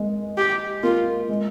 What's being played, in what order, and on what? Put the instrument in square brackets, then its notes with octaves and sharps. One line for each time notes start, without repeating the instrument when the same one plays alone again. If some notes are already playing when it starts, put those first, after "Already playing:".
Already playing: [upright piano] G#3 A#3
[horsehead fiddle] G4
[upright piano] A#3 [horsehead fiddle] F4
[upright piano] G#3